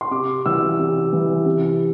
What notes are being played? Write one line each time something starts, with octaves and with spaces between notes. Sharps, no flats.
C6
C3 D6
E3 E6
C3
E3
C3